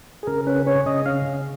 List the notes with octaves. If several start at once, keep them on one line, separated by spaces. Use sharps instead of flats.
G#4
C#3 A#4
C#4 B4
C#4 C#5
C#3 D#5
C#4 F5
C#3